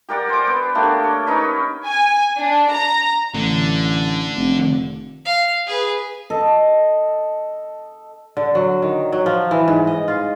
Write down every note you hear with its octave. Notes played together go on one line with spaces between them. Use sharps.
G4 A#4 D5 F#5
C5 G#5 D6
B3
A3 A#3 D4 G4
C#5
C#4 D#4 A#4 B4
G#5
D4
A#5
A1 D3
F1
F5
G#4 B4
A4 D#5 A5
D3
F#3
D#3
F#3
F3
E3
G#2
D#5
F4